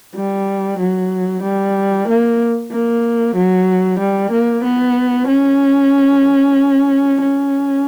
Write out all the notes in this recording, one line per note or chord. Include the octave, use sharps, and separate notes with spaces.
G3
F#3
G3
A#3
A#3
F#3
G3
A#3
B3
C#4
C#4